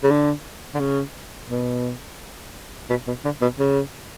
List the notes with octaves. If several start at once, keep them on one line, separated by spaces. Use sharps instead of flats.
C#3
D3
D3
C#3
B2
B2
B2
D3
B2
C#3